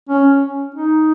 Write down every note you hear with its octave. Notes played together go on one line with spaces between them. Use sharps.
C#4
D#4